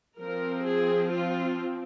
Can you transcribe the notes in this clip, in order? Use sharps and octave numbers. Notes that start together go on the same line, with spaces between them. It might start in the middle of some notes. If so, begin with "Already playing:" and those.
F3 C4 A#4
G#4
F4